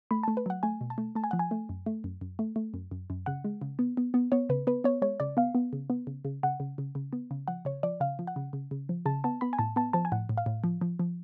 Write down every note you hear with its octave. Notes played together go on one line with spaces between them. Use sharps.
A3 B5
A3 A5
B4
F#3 F#5
A3 G#5
B2
A5
A3
A3 A5
G#5
F3 F#5
G#5
A3
F#2
A3
F#2
F#2
A3
A3
F#2
F#2
F#2
C#3 F#5
G#3
C#3
B3
B3
B3
B3 C#5
C#3 B4
B3 B4
B3 C#5
G#3 C#5
C#3 D5
B3 F5
B3
C#3
B3
C#3
C#3
C#3 F#5
C#3
C#3
C#3
B3
C#3
F3 F#5
C#3 C#5
F3 D5
C#3 F5
F3
F#5
C#3
C#3
C#3
F3
C#3 A5
B3 A5
B3 B5
G#5
A2 A5
B3 A5
F3 A5
G#5
A2 F#5
A2
F5
A2
F3
F3
F3